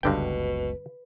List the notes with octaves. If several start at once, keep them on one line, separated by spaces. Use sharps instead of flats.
F#1 C#2 G2 B2 D3 B4 G5